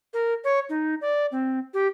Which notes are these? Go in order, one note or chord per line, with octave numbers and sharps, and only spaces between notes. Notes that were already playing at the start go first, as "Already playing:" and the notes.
A#4
C#5
D#4
D5
C4
G4